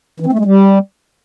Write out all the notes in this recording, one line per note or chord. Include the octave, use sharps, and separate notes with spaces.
E3
C4
A3
G#3
G3